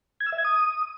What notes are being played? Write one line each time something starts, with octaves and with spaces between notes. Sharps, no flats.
G#6
E6
E5
G#6
D#6